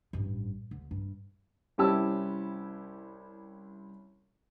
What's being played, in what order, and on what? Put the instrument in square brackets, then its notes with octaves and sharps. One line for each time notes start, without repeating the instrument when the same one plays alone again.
[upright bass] A1 G2
D2
G2
[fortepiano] C2 C#4 E4 G4 A5 E6